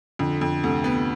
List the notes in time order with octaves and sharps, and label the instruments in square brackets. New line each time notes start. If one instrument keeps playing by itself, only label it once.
[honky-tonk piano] F2 [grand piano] D3
[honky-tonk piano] F2
[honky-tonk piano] D2 [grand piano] C3
[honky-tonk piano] B3